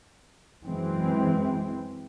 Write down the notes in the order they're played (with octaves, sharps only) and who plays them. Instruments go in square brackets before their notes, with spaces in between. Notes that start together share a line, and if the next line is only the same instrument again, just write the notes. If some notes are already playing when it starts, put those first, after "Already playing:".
[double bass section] F#2 E3 G#3 C4